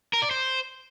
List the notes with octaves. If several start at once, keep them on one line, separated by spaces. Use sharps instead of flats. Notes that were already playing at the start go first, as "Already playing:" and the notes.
A#4
D5
C5